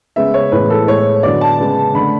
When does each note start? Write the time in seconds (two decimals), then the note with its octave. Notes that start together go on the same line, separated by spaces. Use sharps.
0.16 C#3 G#3 B3 E5
0.34 C#5
0.52 A2 E3 G#3 B3 B4
0.70 A4
0.88 A2 G#3 B3 C#5
1.23 D3 F#3 B3 D5
1.41 A5
1.60 C#3 G#3 B3
1.95 D3 A3 B5